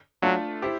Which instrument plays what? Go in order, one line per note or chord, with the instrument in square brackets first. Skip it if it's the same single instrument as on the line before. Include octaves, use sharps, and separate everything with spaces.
[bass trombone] F#3 [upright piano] A3 D4 F4 A4
[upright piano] E4 G4 C5